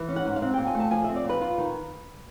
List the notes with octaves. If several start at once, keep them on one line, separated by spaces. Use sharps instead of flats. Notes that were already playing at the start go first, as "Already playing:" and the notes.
Already playing: E3
C#4
F#5
G#2
F5
C4 F#5
A#2 G5
G#5
A3
A5
F3 G#5
C4 E5
D5
A#2
B4
F4
D#3